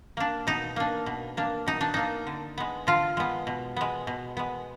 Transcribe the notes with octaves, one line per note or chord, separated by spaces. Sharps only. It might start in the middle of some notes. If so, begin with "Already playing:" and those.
A#3 D4
B2 D#4
A#3 D4
B2
A#3 D4
B2 D#4
D4
A#3 D4 D#4
D3
G#3 B3
D3 F4
G#3 B3
B2
G#3 B3
B2
G#3 B3